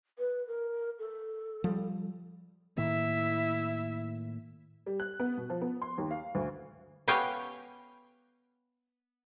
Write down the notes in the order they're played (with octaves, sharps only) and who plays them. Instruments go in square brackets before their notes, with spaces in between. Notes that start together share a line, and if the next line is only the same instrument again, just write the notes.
[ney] B4
A#4
A4
[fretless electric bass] F3 G3
[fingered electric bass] A2 D#3 A#3 [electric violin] E4 E5
[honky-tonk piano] G3
F#6
B3
B2
F3
B3
C6
D#2
F5
D2
[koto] B3 G4 C#5 F5 G5 G#5